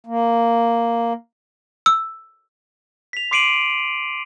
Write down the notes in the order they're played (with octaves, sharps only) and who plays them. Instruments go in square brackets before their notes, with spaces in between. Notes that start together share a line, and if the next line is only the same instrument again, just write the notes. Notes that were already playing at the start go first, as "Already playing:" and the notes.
[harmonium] A#3
[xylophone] E6
[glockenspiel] B6 F7
C6 D6 C7 D7 D#7 F#7